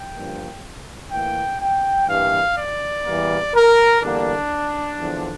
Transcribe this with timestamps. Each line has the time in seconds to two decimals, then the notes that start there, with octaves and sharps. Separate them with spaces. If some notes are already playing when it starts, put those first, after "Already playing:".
Already playing: G5
0.15 G2 F3 A#3
1.11 A2 E3 A#3 G5
1.60 G5
2.08 G2 E3 G3 A#3 F5
2.57 D5
3.05 E2 E3 G3 A#3
3.54 A#4
4.02 E2 D3 G3 A#3 D4
4.99 E2 D3 F3